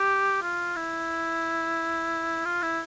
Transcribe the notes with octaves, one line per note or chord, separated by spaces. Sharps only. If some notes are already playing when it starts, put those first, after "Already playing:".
Already playing: G4
F4
E4
F4
E4